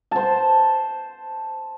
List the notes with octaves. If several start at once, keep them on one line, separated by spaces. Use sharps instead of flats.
C5 A5